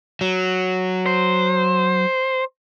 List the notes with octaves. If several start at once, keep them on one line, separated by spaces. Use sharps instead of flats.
F#3
C5